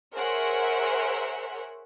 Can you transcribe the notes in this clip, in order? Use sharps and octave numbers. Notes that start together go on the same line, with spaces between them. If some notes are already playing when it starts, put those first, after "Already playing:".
G#4 A#4 C5 C#5 E5 F#5